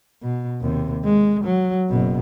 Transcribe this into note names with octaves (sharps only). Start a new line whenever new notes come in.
B2
D#2 C3
G#3
F#3
F#1 B2